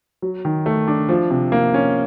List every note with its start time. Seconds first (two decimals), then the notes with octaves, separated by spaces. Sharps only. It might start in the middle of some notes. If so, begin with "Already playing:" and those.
0.22 F#3
0.45 D#3
0.66 A3
0.88 D4
1.09 F3
1.30 C3
1.52 A#3
1.74 C#4